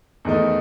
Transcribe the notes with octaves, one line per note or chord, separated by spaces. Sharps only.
E2 D#3 A3 D#4